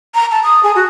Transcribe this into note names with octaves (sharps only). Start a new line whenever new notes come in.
A#5
A5
D#6
G#4
F#4